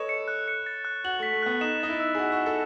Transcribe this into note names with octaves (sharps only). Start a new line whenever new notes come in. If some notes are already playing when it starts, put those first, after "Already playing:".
Already playing: A4 B4 C#5 D#5 E7
C#7
F#6
C#7
A6
F#6
F#4 F#7
A3 B6
A3
B3 F#6
D#4 E7
D#4 A6
E4
E6
G#4
F#4 B6
F#4
F#6
A4